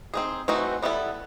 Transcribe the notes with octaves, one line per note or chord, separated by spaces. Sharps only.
C4 D#4 G#4
E3 A3 C4 D#4 F#4
G3 B3 E4 A4